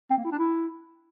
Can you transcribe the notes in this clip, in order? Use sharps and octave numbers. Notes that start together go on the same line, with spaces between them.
C4
A#3
E4
D4
E4